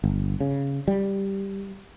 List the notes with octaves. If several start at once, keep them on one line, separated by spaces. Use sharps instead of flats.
G1
C#3
G3